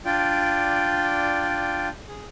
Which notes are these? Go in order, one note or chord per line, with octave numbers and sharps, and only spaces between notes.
D4 F4 D5 G5
G#4